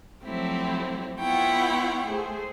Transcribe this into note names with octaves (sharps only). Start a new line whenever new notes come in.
F3 F#3 A3 C4 E4 G4
B3 E4 F4 C#5 F#5 G5
A3 G#4 C5